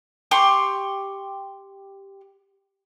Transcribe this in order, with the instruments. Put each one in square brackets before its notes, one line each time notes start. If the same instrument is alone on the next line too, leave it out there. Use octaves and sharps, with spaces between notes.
[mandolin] G4 C6 C#6